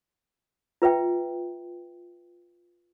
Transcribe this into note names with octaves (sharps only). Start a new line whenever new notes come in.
F4 B4 E5 G5